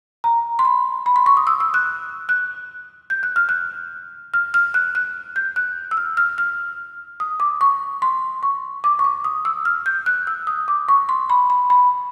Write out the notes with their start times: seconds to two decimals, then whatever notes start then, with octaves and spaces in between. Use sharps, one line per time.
0.24 A#5
0.59 C6
0.65 B5
1.06 B5
1.16 C6
1.26 C#6
1.37 D#6
1.47 E6
1.60 E6
1.74 F#6
2.29 F#6
3.10 G6
3.23 F#6
3.36 F6
3.49 F#6
4.34 F6
4.54 F6
4.74 F#6
4.95 F#6
5.36 G6
5.56 F#6
5.91 E6
5.97 F6
6.17 F6
6.38 F6
7.20 D#6
7.40 D6
7.61 C#6
8.02 C6
8.43 C#6
8.84 D6
8.99 C#6
9.04 D6
9.24 D#6
9.45 E6
9.65 F6
9.86 G6
10.06 F#6
10.27 E6
10.47 D#6
10.68 D6
10.89 C#6
11.09 C6
11.30 B5
11.50 B5
11.70 B5